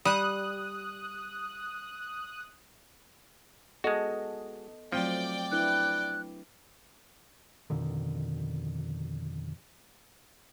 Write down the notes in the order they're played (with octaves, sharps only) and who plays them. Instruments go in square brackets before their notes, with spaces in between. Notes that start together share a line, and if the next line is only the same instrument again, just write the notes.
[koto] G3 [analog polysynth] D#6 F#6
[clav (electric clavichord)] G#3 F#4 [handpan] B3 A4 D#5
[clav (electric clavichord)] F3 [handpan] F#3 A3 C4 [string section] D5 G5
[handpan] D4 E4 B4 [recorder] F#6
[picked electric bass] F2 B2 D3 D#3